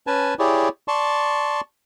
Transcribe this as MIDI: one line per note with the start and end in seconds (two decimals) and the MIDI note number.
0.07 0.34 61
0.07 0.34 71
0.07 0.34 80
0.07 0.34 81
0.39 0.69 64
0.39 0.69 67
0.39 0.69 68
0.39 0.69 73
0.39 0.69 74
0.88 1.61 74
0.88 1.61 81
0.88 1.61 84
0.88 1.61 85